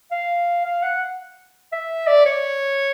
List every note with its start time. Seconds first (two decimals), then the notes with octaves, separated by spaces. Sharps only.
0.11 F5
0.65 F5
0.83 F#5
1.72 E5
2.07 D5
2.26 C#5